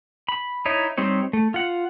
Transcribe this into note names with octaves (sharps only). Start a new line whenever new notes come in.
B5
D#4 E4 C#5
G3 C4 D#4 C#5
A3
F4 F#5